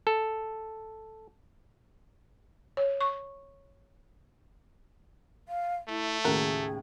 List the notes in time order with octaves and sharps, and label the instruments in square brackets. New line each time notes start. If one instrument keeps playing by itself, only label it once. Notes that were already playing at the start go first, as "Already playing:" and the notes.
[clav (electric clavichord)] A4
[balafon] C#5
C#6
[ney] F5
[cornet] A3 [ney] E4
[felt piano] D#2 A2 C#3 [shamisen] F#4 A#4 [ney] G#4